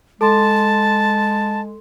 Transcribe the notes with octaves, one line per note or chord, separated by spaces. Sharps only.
G#3 A4 A5 C6 E7